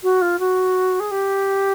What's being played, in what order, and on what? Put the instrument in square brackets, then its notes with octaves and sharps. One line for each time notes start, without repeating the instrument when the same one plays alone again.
[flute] F#4
F4
F#4
G#4
G4